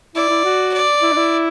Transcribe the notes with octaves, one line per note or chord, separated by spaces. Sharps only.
E4 D5
E4
F#4
D5
E4
D4
E4